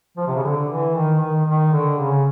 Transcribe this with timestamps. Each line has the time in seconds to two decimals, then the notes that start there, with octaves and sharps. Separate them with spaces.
0.17 F3
0.27 C3
0.35 C#3
0.43 D3
0.70 E3
0.95 D#3
1.20 D#3
1.46 D#3
1.72 D3
1.98 C#3